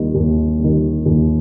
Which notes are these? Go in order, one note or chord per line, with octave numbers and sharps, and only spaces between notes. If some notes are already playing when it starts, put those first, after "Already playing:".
Already playing: D#2 D#3 G3
D#2
D#3 G3
D#2